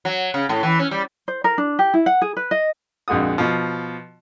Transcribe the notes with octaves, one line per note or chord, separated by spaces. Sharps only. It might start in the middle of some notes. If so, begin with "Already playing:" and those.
F#3
C#3
A2
E3
C#4
G3
C5
A#4
D4
G4
E4
F#5
G#4
B4
D#5
A#1 F2 G#3 F#4 D#6
B2 F3